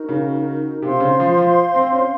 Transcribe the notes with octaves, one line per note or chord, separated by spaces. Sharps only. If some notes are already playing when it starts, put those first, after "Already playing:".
Already playing: D#4 F#4 A#4
C#3
C3 C5 F5 C6
C#3
F3
F3
C4
C#4